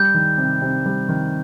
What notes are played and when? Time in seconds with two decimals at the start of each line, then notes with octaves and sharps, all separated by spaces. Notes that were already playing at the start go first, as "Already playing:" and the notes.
Already playing: G3 G6
0.14 D#3
0.38 C3
0.62 C3
0.86 G3
1.09 D#3